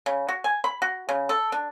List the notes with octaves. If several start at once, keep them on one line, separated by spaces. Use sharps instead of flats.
C#3
F#4
G#5
B5
F#4
C#3
A4
D4